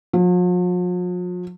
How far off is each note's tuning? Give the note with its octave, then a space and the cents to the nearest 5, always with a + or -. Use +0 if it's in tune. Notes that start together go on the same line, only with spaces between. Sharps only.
F3 +45